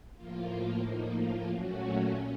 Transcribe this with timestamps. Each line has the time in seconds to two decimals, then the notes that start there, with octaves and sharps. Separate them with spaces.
0.16 A2 F3 A#3 F4
0.84 D#4
1.18 F4
1.51 A#2 F#3 A3 C#4 F#4